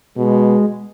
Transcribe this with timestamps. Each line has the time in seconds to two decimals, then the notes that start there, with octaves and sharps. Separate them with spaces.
0.17 B2 G#3